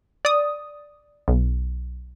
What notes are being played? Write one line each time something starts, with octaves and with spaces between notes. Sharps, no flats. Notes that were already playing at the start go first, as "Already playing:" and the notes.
D5 D#6
B1